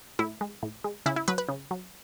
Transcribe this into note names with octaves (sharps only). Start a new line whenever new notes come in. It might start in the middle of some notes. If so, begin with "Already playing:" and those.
A2 E4
G#3
A2
G#3
C#3 E4
E4
F#3 B4
B4
C#3
F#3